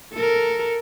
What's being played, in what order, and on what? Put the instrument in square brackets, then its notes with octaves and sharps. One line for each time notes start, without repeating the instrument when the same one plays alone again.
[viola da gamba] A4 A#4